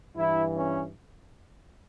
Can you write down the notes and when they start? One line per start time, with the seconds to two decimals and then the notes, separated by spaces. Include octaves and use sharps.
0.16 G2 E3 E4
0.55 C#4